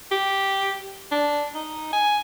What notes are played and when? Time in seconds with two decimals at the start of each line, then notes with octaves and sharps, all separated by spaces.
0.11 G4
1.12 D4
1.55 D#4
1.93 G#5